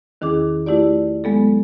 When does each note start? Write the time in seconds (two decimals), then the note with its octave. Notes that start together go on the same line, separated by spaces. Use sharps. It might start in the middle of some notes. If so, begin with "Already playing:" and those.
0.21 E2 D#3 C#4 E4 G#4 D6
0.66 A3 E4 F4 G4 D5
1.24 F#3 G#3 B3 A4